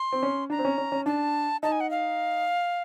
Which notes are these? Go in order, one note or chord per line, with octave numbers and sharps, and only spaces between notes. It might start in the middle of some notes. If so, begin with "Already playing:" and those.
Already playing: C6
C4
C#4
D4 A#5
C4
C#4
C#4
C#4
D4 A5
D#4 A5
G#5
F#5
F5